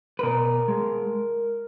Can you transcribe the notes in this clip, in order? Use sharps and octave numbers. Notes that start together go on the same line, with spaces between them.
B4
B2 A#4
G#3